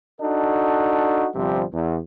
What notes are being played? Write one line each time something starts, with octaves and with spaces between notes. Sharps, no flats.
D4 D#4 F#4 A4
G1 C3 F3 G3
E2